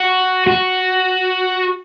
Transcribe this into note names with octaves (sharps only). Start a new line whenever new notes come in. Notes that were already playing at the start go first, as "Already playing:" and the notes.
Already playing: F#4
F#4